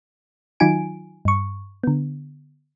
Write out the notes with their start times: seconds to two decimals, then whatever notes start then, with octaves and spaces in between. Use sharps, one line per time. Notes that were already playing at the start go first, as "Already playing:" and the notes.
0.60 D#3 F#3 D#4 F4 G#5 D7
1.25 G2 C#6
1.84 D3 B3